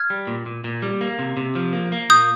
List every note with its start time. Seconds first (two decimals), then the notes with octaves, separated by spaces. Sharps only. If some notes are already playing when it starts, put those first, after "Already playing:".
Already playing: F6 G#6
0.10 G3
0.27 A#2
0.46 A#2
0.64 A#2
0.82 G3
1.01 A#3
1.19 C3
1.37 C3
1.55 F3
1.73 A#3
1.92 A#3
2.10 A#2 D#6 G6